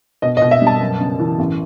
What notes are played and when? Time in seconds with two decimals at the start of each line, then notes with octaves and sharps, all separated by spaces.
0.22 B2 D#5
0.37 D#5
0.42 B2
0.51 E5
0.62 G3 A5
0.81 F#2
1.00 C#3
1.20 E3
1.39 A1